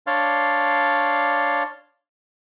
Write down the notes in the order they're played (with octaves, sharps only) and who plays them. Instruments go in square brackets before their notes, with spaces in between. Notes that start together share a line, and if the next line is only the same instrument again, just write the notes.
[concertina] D4 C#5 D5 F5 C6